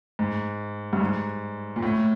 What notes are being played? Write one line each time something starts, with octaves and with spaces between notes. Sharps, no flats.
G#2
G2
G#2
A#2
A2